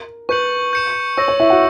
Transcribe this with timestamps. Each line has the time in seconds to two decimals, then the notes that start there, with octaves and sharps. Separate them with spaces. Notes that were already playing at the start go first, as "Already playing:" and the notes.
Already playing: A#4
0.29 B4 C#6 G6 C#7 F#7
0.73 G6 C#7 E7
1.17 C#5 C#6 E6 A#6
1.28 C#5
1.40 E4 E5
1.50 F#4 F#5